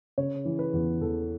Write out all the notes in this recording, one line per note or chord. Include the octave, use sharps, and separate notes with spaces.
C#3 C#5
E3
B4
E2
E2 A4